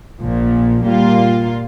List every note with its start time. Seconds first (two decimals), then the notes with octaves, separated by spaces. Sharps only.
0.21 A#1 A#2 F3
0.85 A#2 G3 A#3 F4